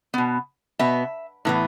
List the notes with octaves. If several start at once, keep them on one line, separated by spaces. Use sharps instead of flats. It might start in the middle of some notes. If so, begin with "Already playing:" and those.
B2 B3
B2 B3 E5
A2 E3 B3